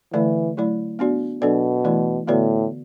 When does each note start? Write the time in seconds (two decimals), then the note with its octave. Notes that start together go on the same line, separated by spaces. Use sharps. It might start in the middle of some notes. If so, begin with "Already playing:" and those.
0.14 D3 E3 A3 E4 D5
0.57 F#3 A3 E4 D5
0.99 B3 D4 F#4 D5
1.42 B2 F#3 D4 A4 D5
1.85 E3 A3 E4 D5
2.27 A2 D3 B3 F#4 B4 D5